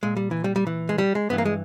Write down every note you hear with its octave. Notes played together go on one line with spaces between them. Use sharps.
A#2 G#3
G3
E3
G3
G3
E3
G#3
G3
G#3
G2 E3 B3
A#3
G#3